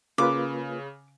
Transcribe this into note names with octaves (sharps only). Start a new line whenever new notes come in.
C#3 A#3 F4 B4 D6